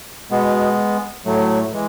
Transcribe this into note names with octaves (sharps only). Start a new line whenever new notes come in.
B2 G#3 B3
A2 F#3 A3
E3 G#3